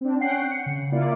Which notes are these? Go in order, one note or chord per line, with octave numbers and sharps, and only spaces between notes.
C4 D4
C#4 F#5 G5 C7
C#7
C#3
A#3 E4 F4 D5